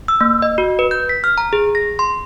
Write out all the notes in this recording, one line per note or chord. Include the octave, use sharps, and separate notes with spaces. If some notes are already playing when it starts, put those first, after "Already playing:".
E6
A#3
D#5
F#4
B4
G6
B6
F6
A#5
G#4
A#6
C6